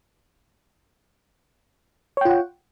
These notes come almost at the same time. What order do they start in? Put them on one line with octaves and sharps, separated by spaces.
C#5 G5 F4 F#5